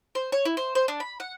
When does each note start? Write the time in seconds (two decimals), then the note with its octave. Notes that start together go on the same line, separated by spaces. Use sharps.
0.15 C5
0.32 C#5
0.45 E4
0.57 C5
0.75 C5
0.88 D4
1.00 B5
1.20 F#5